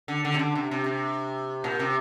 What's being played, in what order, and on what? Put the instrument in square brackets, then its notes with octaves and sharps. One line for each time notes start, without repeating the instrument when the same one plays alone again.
[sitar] D3
D3
C3
D3
C3
C3
C3
A#2
C3